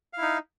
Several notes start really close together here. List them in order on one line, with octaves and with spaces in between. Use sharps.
F5 E4 D#4